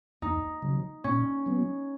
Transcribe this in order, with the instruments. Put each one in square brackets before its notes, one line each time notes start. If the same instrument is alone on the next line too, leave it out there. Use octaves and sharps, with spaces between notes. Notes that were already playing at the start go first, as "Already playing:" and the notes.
[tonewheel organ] E2 [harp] D#4
[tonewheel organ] C#3 F#3
[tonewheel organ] A#2 [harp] C#4
[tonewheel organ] F#3 B3